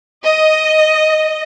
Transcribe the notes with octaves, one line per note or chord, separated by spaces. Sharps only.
D#5